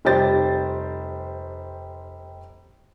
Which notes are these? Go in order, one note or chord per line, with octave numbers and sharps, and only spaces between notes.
F1 G3 G4 C5 G6 A6